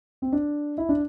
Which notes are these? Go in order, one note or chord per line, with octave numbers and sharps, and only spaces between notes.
C4
D4
E4
D4